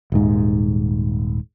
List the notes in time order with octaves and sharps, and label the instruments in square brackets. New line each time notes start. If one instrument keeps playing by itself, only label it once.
[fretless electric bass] D#1 G#2